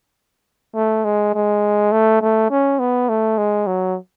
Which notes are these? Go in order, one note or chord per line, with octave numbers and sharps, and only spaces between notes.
A3
G#3
G#3
A3
A3
C#4
B3
A3
G#3
F#3